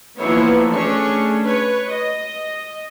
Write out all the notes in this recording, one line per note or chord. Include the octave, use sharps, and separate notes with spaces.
E3 F3 A#3 B3 E4 C#5
A3 C#4 D4 G#4 C#5
B4 C#5
D#5